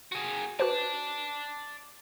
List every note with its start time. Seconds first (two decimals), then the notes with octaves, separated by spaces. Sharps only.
0.12 F#4 G#4
0.60 F#4 B4 C5 D5 A5